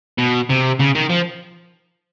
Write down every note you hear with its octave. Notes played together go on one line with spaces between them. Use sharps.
B2
C3
C#3
D#3
F3